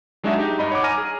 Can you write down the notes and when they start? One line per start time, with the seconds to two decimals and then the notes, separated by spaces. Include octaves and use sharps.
0.23 F#3 G#3 D4 D#4 F#4 E5
0.39 D#4 G4
0.59 G2 D#5 B5
0.71 C#5 F#5 D6
0.83 G#5 A#5 F6 A#6 D#7
0.98 G#4